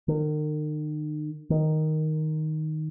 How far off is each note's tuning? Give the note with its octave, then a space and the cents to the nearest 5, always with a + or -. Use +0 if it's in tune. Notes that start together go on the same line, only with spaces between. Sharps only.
D#3 -40
D#3 +0